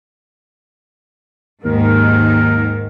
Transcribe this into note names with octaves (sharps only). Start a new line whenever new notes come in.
D#2 G#2 D#3 A#4